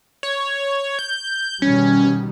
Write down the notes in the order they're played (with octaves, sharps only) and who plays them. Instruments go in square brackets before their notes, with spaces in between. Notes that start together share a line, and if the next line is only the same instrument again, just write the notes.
[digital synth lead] C#5
G6
[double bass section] B2 D#3 G3 [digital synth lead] C#4